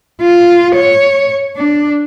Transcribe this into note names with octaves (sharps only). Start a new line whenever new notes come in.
F4
C#5
D4